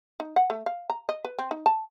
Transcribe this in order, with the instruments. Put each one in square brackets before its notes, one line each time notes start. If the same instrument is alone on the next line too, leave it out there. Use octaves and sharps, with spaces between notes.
[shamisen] D#4
F#5
A3
F5
A#5
D#5
B4
C4
D#4
A5